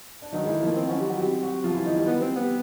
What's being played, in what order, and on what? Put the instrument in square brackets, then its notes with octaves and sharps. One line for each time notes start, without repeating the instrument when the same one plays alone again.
[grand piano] D4
[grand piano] D#3 D#4 [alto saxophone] F#3
[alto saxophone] G#3
[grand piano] E3 E4
[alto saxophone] A3
[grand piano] F3 F4 [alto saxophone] A#3
[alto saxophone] C4
[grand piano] F#3 F#4 [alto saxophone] C#4
[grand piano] G3 G4
F#3 F#4
[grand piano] G3 G4 [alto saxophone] C4
[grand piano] F#3 F#4
F3 F4
E3 E4
D#3 D#4
G3 G4
[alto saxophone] B3
C4
B3
[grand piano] G4